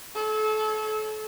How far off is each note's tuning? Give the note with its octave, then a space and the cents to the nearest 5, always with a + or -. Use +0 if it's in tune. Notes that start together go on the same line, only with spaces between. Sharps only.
A4 -30 C#5 +0